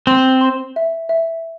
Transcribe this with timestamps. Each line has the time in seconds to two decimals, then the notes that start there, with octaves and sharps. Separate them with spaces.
0.07 C4 C6
0.41 C6
0.76 E5
1.09 E5